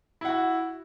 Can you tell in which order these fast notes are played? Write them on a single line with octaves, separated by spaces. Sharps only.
E4 F#5 F#4